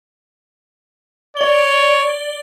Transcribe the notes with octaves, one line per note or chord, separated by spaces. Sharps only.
C#5 D5 G7